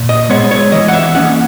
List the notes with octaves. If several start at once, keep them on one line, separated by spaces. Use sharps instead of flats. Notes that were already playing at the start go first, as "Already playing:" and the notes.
Already playing: A#2
D#5
G#3 B3 C#5
C#5
E3 D#5
F#5
E5
A#3 C#4 F#5